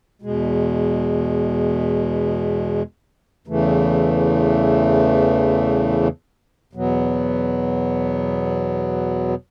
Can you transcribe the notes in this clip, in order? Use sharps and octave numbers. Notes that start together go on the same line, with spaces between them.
E2 B2 G#3
E2 C#3 E3 A3
E2 B2 F#3 B3